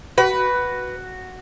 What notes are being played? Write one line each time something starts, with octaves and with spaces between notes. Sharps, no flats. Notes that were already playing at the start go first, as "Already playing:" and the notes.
F#4 B4